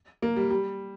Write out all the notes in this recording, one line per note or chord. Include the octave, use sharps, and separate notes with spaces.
A#3
G3
G3